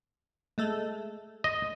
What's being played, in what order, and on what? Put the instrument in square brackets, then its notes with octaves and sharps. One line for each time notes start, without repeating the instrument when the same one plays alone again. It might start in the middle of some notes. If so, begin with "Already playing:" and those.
[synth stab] G#3 A3 A4
[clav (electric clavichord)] D#5